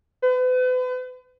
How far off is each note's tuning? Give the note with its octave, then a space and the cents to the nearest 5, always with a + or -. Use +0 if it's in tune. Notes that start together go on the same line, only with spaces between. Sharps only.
B4 +40